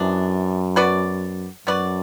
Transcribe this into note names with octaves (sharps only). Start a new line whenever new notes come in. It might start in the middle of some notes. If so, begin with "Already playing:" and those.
Already playing: F#2 C3 E3 B3 D4
B3 F#4 B4 D5
F#2 B3 F#4 B4 D5